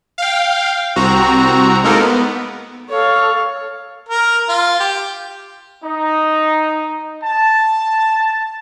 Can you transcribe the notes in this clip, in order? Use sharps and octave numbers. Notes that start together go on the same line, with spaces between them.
F5 G5
C2 C4 F#4 A#5
G#3 A#3 D#4 A4 A#4
B3
A4 C#5 F5
A#4
F4
G4
D#4
A5